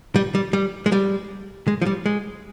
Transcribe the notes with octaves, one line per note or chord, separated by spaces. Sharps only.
G3
G3
G3
G#3
G3
G#3
F3
G3
G#3